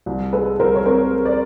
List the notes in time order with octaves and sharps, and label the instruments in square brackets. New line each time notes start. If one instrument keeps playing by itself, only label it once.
[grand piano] C2
[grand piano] G#3 [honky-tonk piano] A4 B4
[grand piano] C2 [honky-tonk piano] A#4 C5
[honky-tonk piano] C#5
[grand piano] C4 [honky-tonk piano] A#4 C5
[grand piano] G#3
[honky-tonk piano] C5 D5